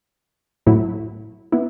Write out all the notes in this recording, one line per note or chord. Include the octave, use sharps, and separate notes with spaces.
A2 F#3 A3 E4
B3 E4